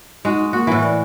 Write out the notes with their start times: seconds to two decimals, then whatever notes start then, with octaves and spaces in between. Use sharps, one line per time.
0.25 G#3 D#4 F#4
0.53 A#3 F#4
0.67 A2 E3
0.83 D5